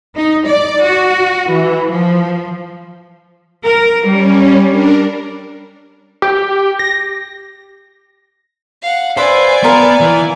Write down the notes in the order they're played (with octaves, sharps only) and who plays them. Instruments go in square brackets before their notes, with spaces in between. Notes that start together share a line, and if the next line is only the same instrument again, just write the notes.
[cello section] D#4
D5
F#4
E3
F3
A#4
[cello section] G3 [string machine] C#4
[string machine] D4 A#4
[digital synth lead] G4
A#6
[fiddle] F5 F#5
[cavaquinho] B4 E5 B5 [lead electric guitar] C5 [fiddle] D5 G#5
[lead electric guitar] B3 [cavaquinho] F4 A#4 F5
[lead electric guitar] E3